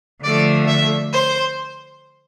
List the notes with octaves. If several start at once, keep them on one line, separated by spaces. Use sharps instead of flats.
D3 F3 A3 D5
E5
C5